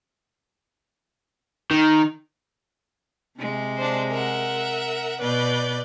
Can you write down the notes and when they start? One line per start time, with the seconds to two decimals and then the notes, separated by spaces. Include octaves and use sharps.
1.71 D#3
3.39 C3 G#3
3.77 D4 C5
4.10 A#4 E5 F#5
5.20 B2 B4 D5 G6